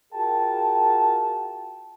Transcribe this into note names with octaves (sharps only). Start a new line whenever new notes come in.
F4 F#4 G#4 A#4 G5 A5